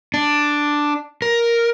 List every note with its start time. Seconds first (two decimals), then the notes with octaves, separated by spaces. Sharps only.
0.14 D4
1.22 A#4